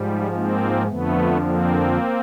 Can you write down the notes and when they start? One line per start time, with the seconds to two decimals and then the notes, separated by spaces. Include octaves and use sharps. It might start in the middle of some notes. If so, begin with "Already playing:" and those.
Already playing: G#2 F3 G3
0.33 A#3 C4
0.88 F2 D3 F3 A3 B3
1.43 A#3 C4